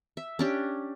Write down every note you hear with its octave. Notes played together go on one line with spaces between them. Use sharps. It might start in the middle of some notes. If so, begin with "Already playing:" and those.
E5
C#4 D4 G4